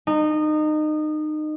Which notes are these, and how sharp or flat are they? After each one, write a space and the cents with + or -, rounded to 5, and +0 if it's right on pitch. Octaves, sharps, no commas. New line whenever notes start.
D#4 -25